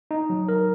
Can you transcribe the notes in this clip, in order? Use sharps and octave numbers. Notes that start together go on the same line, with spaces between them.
D#4
F#3
A#4